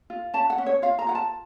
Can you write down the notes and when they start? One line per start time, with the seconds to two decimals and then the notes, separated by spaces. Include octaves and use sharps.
0.10 F4
0.34 C#4 A5
0.50 F#5
0.58 C#4
0.66 C#5
0.82 F4 F5
0.99 A#5
1.07 F4 F#5
1.15 A5